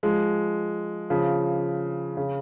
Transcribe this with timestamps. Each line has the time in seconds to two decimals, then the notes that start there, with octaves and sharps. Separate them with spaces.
0.03 F3 G#3
1.10 C#3 F3
2.17 C#3